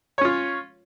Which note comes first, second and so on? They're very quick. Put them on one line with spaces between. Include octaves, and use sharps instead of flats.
C#5 C#4 F4